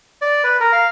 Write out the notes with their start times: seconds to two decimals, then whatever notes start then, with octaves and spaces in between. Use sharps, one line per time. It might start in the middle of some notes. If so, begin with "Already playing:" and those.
0.22 D5
0.44 B4
0.60 A#4
0.72 F5